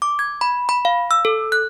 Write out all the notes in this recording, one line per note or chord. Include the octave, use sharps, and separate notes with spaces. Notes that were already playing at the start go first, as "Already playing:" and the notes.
D6
G#6
B5
B5
F5
E6
A4
F#6